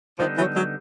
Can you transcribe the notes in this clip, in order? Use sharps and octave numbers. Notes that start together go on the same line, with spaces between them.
D3 D#3 F3 G3 B3 D#4
E3 F#3
F#3 G#3